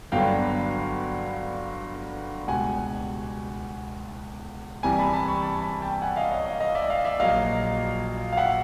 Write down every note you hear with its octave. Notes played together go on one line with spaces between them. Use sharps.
G1 G2 D3 F#3 B3 F5 G5
C#2 B2 G3 F#5 G#5
C2 C3 E3 G3 G#5 A#5
A5 B5
A5 B5
B5 C#6
A5 B5
A5 B5
G5 A5
F#5 G#5
D#5 F5
C#5 D#5
D#5 F5
D#5 F5
D5 E5
D#5 F5
D5 E5
A#1 A#2 F#3 A#3 D#5 F5
F5
E5 F#5